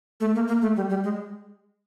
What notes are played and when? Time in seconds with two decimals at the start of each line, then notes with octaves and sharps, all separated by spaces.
0.20 A3
0.35 A#3
0.48 A#3
0.62 A3
0.76 G3
0.89 G3
1.04 G#3